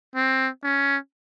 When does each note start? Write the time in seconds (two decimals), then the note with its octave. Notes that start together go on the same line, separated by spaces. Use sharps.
0.15 C4
0.63 C#4